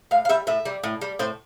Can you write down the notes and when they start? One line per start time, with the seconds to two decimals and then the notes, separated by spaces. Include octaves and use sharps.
0.11 A2 F5
0.25 F5
0.29 G3 E5
0.47 A2 E5
0.65 G3
0.83 A2
1.01 G3
1.19 A2 C5